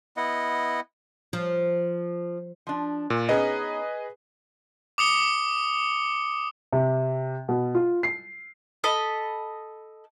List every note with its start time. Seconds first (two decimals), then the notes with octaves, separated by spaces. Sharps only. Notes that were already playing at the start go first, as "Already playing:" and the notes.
0.17 B3 E4 D#5 F#5
1.33 F3
2.67 F3 D4
3.10 A#2
3.29 B3 C#4 D#4 G#4 B4 D#5
4.98 D6 D#6 C#7 G7
6.72 C3
7.48 B2
7.75 F4
8.03 C7
8.84 A4 D#5 B5